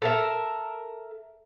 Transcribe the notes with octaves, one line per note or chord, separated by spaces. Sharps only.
A4 A#4 E5